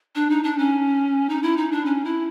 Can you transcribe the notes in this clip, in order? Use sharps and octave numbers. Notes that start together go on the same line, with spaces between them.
D4
D#4
D4
C#4
D#4
E4
D#4
D4
C#4
E4